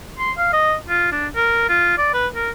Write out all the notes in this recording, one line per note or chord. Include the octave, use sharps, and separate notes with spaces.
C6
F5
D#5
F4
D4
A#4
F4
D5
B4
A#4